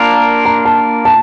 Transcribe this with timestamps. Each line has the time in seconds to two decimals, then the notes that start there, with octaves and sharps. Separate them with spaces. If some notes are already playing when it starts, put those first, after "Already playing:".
Already playing: A#3 D4 F4 A#4
0.45 A#5
0.65 A5
1.05 A5